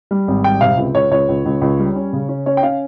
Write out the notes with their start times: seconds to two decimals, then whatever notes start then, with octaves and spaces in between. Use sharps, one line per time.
0.11 G3
0.28 G#1
0.44 G3 G5
0.61 C3 F5
0.77 C#2
0.95 C#2 C#5
1.11 C#2 C#5
1.29 C#2
1.46 C#2
1.61 C#2
1.79 G3
1.96 C#4
2.13 C#3
2.29 C#4
2.46 C#4 C#5
2.57 G5
2.63 C#4 F5